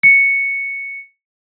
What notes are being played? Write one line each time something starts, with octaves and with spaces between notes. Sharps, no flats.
C#7